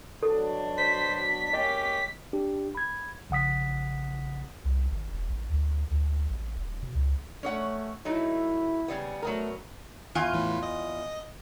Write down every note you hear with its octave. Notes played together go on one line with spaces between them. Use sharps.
B2 F#3 D4 A4
C5 B6
G#3 A#3 C#4 G4 D#5
D4 G4
B5 G#6
A#1 C#3 F#5 D#6 B6
C2
G#1
E1
A1
D2
D2
A1
D#1
B2
C#2
A3 C#4 C#5 F#5
F#3 A3 D#4 E4
C#3 G3 B3
F#3 A3 B3 A#4
E2 F4 G#5
A2 E3
D#5